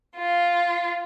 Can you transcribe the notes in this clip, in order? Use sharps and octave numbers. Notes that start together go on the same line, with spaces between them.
F4